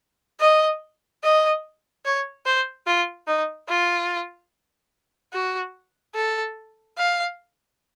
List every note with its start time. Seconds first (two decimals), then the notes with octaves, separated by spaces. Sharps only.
0.40 D#5
1.23 D#5
2.05 C#5
2.46 C5
2.86 F4
3.27 D#4
3.68 F4
5.33 F#4
6.15 A4
6.98 F5